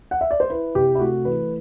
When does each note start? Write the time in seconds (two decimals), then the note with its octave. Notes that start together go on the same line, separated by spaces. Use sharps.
0.11 F#5
0.21 E5
0.31 D5
0.40 C5
0.50 E4 B4
0.75 C3 G4
0.95 E4
0.99 A3 F#4
1.25 E3 B4